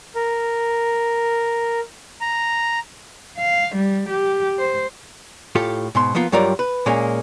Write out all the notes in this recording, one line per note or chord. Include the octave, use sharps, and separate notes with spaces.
A#4
A#5
F5
G3
G4
C5
A2 F4 G4 A4
G#2 B2 C6
F3 A#3 B3 F4
G2 F#3 G3 F4 A#4 D5
B4
A#2 G#3 A#3 C#4